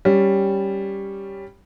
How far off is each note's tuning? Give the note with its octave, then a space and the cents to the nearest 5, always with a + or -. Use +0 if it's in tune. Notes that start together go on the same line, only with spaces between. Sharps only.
G3 +0 C#4 +0